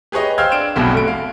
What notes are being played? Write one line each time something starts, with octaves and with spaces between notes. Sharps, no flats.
G4 G#4 B4 C#5 D#5
C5 F5 G5 E6 F6 G#6
D4 D7 E7
F1 B1 G2 B2 F#4 G4
A3 D7
F5